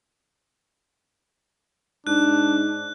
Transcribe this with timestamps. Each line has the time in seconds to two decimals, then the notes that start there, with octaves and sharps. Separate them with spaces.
2.07 G#2 D4 F#6